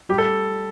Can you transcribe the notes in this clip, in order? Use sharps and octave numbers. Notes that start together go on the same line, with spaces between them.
G3 G4
A4